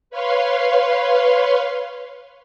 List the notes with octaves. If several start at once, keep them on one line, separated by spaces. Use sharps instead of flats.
B4 C#5 F5 C6